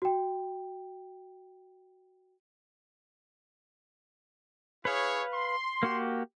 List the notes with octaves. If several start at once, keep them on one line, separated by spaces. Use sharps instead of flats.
F#4 G5
E4 G#4 B4 C#5 F5
C6
A#3 F#4 G4